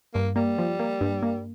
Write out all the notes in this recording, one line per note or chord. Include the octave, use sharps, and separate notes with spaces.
G2 A#3
G3 A#3
F3
A#3
G2
A#3